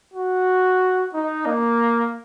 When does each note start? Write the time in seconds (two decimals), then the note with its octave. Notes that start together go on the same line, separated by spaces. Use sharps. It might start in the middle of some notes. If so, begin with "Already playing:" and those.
0.14 F#4
1.14 D#4
1.46 A#3